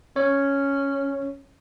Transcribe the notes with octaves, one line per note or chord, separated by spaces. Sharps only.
C#4 C#5